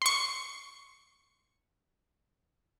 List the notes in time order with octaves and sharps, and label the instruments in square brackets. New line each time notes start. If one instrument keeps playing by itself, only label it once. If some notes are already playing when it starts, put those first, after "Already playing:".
[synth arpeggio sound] C6 C#6